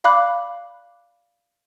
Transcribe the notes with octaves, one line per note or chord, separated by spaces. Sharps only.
D5 F5 B5 D6 F#6